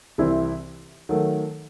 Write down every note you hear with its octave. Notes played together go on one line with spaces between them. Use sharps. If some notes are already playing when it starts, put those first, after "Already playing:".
C2 C3 E3 C4 E4
D#3 F#3 A3